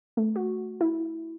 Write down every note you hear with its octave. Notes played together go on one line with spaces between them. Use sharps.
A3
F#4
E4